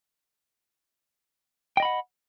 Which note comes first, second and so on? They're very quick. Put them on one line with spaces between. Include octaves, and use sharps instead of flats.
G5 D#5 B5 F#5